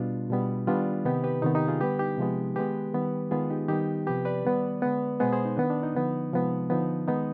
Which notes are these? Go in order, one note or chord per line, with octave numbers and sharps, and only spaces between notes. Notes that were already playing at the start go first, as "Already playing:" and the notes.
Already playing: B2 G3 B3 D4 F4
B2 G3 B3
D#3 G3 B3 D4 F4
C3 D#3 B3 D#4 G4
G4 B4
C3 D#3 B3 D#4
D#4 G4
F4 G#4
D3 G3 B3 G4 B4
D#4 G4
C3 F3 G#3 B3
D#3 G#3 B3 G4 B4
D#3 G3 B3
D#3 G#3 B3 F4 G#4
D#4 G4
D#3 G3 B3 D#4 G4
C3 F3 B3 G4 B4
B4 D5
D#3 G3 B3
D3 G#3 B3
B2 G#3 B3 G#4 C5
G#4 C5
D#4
D#3 B3 D4
D4
D#4
D3 F3 B3
C3 F3 G#3 B3
D3 F3 B3 D#4
D#3 G#3 B3 D#4